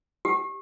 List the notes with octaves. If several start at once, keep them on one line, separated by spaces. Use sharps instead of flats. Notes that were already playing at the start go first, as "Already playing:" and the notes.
G4